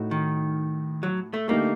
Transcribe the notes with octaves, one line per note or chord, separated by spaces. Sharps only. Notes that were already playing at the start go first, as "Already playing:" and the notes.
Already playing: A2 A3 D#4 F#4
D#3
F#3
A3
D3 A3 A#3 D#4 G4